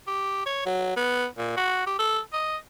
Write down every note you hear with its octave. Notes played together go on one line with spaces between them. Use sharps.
G4
C#5
F#3
B3
A#2
F#4
G4
A4
D#5